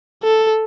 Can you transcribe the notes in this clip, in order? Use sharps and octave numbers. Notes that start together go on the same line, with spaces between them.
A4